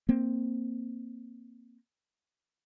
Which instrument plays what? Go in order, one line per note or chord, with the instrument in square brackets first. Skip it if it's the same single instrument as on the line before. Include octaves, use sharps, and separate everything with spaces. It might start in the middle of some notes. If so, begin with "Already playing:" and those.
[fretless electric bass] A#3 C4